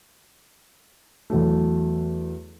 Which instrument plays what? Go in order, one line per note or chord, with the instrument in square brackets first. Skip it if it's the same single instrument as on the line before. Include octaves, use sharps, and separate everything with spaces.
[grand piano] E2 F#3 A3